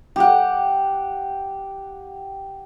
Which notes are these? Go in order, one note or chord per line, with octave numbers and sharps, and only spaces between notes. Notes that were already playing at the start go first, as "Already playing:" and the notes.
G4 F#5